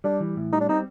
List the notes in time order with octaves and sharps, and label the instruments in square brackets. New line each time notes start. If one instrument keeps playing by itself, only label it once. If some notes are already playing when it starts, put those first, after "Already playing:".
[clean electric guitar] G3 [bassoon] D4
[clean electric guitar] E3
A2
[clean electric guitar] G3 [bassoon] D#4
[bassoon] D4
[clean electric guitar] C4 [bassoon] D#4